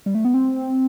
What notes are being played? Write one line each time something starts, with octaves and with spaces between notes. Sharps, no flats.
G3
A3
B3
C4